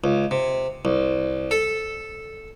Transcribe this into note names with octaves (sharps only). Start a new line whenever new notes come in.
C#2
C3
C2
A4